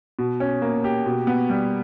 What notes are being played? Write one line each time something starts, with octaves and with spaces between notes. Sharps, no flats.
B2
C#4
A#3
G4
B2
B3
G3